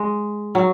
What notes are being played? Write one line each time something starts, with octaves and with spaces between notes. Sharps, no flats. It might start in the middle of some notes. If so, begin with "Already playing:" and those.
Already playing: G#3
F#3